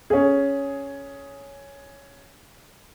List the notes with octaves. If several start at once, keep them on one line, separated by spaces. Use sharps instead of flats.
C#4 G#4